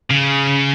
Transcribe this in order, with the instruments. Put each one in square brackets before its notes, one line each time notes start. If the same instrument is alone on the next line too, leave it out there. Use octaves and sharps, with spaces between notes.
[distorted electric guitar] C#3